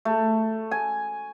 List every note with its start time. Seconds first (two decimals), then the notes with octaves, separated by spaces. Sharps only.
0.05 A3
0.71 G#5